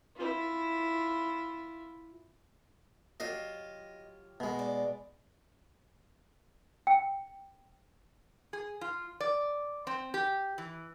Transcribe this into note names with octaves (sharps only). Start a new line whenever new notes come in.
E4 F4
F#3 F4 G4 D#5
B2 G#3
D5
G5
G#4
F4
D5
C4
G4
E3